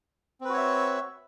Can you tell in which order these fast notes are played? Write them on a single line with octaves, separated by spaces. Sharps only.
C4 B4 F#4 C#5 E5